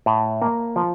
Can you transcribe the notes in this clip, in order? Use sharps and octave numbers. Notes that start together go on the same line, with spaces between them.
A2
A#3
F3